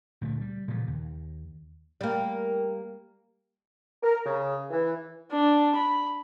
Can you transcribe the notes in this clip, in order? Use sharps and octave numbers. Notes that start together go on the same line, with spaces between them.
D2 A#2 D3 A3
G3
A#2 C#3 E3 F3
D#2
G3 A#3
A#4
C#3
E3
D4
B5